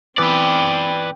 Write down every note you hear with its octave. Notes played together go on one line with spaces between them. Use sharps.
E3 B3 C4 B4 D5 G5